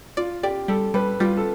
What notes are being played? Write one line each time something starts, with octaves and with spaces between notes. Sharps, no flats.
F4 D5
G4 D5
G3 A4
G3 B4
G3 F4
A4